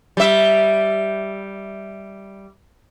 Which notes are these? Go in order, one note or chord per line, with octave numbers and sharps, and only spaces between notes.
G3 E5